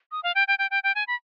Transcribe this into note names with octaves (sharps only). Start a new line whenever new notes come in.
D#6
F5
G5
G5
G5
G5
G5
G#5
B5